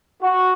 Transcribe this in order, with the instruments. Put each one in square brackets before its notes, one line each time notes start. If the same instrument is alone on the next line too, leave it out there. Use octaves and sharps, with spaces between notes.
[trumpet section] F#4